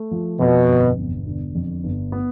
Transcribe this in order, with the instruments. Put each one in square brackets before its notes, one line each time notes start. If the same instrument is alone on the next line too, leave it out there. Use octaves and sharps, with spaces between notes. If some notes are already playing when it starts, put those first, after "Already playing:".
Already playing: [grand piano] A3
F3
[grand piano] F2 [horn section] B2
[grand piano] G1
E1
D3
F2
G1
B3